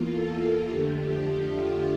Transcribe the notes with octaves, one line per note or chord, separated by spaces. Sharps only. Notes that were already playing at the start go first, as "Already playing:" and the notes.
Already playing: E2 E3 A#3 F4
A4
F2 D3 F3 A3 G4
G4
G4
F4